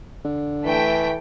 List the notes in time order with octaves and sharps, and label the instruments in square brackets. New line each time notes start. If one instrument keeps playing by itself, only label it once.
[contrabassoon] D3
[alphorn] E3 [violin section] A3 G5 B6